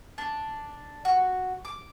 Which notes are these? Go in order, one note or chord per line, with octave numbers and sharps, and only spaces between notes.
D4
F#4
D6